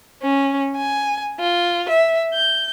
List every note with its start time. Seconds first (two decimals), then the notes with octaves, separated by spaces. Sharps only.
0.22 C#4
0.76 G#5
1.40 F4
1.89 E5
2.34 G6